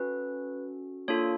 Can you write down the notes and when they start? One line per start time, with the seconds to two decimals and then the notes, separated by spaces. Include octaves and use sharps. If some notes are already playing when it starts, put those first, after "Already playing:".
Already playing: C#4 F#4 A4 B4
1.08 A#3 D4 F4 A4 C#5